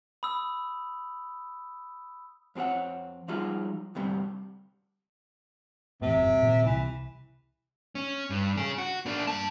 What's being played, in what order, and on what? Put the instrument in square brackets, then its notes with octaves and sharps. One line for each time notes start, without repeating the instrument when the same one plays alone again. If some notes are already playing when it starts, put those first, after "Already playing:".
[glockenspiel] B5 D#6 E6
[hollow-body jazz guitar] F2 C4 G4 C#5 F#5
F3 G3 G#3 D#4 F4 F#4
D2 G2 C3 G3
[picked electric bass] E2 A2 [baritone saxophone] C3
[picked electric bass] G1 F2
D#1
A#2 D#3 F3
[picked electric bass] C2 C3 [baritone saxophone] E3
[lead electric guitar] C#4
G2
C#4 G#4
F#4
A#3 D4
G2 A5